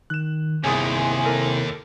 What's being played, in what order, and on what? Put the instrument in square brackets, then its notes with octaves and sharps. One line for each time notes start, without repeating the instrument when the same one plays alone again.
[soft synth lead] D#3 [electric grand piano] F#6 E7
[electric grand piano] G1 G#4 D#6 [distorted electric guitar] D#2 [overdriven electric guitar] C3 E4 [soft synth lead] G#5
[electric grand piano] A4 A#4